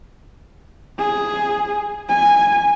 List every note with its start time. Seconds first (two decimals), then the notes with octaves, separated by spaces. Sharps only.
0.99 G#4
2.09 G#5